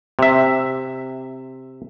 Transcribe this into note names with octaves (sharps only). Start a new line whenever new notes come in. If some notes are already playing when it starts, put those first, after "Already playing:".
C3 E5